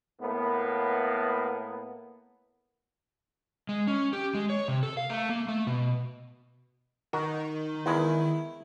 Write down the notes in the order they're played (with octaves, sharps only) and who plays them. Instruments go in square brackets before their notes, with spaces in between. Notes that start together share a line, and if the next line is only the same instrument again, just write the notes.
[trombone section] A2 A#3 B3
[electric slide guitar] G#3
C#4
G4
G#3
C#5
C3
A4
F5
A3
A#3
A3
B2
[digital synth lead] D#3 [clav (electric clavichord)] F#4 A#4
[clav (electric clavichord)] E2 G#3 [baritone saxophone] E4